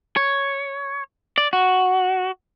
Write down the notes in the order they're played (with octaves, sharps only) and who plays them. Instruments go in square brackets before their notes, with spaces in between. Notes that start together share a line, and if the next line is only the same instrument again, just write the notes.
[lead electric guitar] C#5
D5
F#4